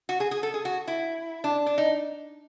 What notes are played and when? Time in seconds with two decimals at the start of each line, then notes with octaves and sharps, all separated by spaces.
0.09 F#4
0.20 G#4
0.31 G#4
0.43 A4
0.54 G#4
0.65 F#4
0.87 E4
1.44 D4
1.66 D4
1.78 D#4